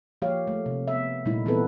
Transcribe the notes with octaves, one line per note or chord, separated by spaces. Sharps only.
F3 A#3 G4 C#5 F5
A3
C3
B3 E5
A#2 G3 A3 D#4 E4
E3 B3 C4 A4 B4